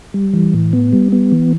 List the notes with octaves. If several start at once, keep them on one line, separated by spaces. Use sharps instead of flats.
G3
E3
A2
B3
G3
B3
E3